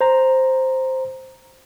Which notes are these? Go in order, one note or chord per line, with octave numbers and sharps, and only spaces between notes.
C5 A#5